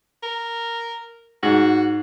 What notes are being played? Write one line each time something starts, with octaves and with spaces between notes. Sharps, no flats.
A#4
G#2 F#4